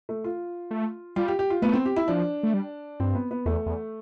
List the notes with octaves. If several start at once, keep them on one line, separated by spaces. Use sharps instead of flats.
A3
F4
A3
G3 F4
G4
G4
F4
A3 B3
C4
G4
E4
F3 D4
A3
G3
G2 C4
B3
B3
E2 A3
E2